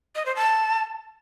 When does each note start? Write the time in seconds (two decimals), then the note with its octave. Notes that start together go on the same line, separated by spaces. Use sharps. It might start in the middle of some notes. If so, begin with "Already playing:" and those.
0.15 D#5
0.26 C5
0.36 A5